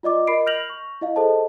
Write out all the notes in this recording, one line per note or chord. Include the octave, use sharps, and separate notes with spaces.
F4 D5 D#5 D6
A#4 D#5 B5 C7 D7
F6 G6 A#6 F7 F#7
C#6
E4 D#5 F5
G#4 A4 C5 D#5 A5